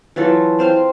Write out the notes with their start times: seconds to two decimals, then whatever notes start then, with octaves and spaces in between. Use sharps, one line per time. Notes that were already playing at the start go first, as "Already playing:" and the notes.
0.16 E3 F#3 F4 A4
0.59 C4 C5 F5 C6